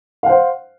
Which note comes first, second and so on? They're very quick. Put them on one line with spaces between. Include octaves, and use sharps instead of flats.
F5 F#5 C5